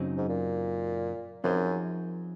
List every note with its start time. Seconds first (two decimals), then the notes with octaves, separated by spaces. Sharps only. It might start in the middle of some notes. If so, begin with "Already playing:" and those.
Already playing: F#2 C#3 F#3 C4 D#4
0.17 G#2
0.29 A#2
1.44 F#2 F3 C4 D#4 G#4 C5